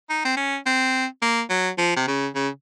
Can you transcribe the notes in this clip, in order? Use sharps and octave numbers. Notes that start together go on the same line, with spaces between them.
D#4
C4
C#4
C4
A#3
F#3
F3
C3
C#3
C#3